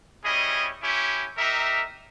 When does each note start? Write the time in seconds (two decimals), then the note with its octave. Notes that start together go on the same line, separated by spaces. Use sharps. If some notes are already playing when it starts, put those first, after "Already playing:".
0.24 G3 C#4 E4 G#4 D#5
0.80 C#4 E4 G4
1.37 D#4 G4 A#4 E5